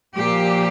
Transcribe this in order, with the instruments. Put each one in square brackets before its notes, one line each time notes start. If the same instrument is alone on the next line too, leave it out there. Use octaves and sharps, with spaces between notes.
[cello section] A#2 F3 G4